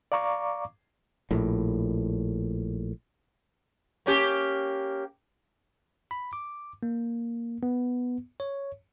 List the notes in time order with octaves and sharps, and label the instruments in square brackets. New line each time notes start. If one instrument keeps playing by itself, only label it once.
[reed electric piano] D5 F5 A#5 C#6 D6
[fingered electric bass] A#1 A2
[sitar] A#3 C#4 G4
[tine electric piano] B5
D6
A#3
B3
C#5